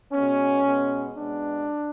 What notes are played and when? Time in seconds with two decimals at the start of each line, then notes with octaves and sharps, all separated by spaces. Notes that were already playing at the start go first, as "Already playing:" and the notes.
0.12 B2 G#3 B3 C#4
0.64 B2 G#3 B3
1.16 B2 G#3 B3 D4